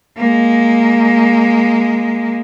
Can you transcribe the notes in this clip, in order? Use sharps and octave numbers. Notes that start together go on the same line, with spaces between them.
G#3 A#3